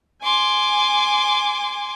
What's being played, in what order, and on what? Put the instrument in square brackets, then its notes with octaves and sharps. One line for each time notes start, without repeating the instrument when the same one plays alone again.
[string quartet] G#5 C6 D6